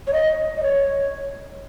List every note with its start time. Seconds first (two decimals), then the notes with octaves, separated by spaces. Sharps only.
0.07 C#5
0.13 D#5
0.57 D#5
0.63 C#5